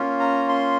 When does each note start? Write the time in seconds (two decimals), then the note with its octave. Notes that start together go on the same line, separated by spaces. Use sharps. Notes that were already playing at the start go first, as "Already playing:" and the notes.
Already playing: A#3 C#4 F4
0.20 A#5
0.49 C6